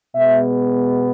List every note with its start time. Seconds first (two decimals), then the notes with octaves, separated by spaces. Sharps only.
0.14 B2 G#3 B3 E5